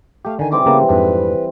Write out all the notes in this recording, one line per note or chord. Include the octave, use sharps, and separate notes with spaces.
A3 G4 F5
D3 D#3 G#5
E3 G3 C4 D6
C#3 A#3 B3
F2 G#2 D4 B4